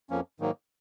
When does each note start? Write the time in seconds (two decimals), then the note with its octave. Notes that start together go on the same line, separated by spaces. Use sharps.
0.10 F2 F3 A#3 C#4
0.40 G#2 D#3 F#3 A#3